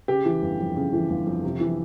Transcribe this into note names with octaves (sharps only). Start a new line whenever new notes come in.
C#3 G4
E3
G1
F2
C#3
E3
G1
F2
C3
E3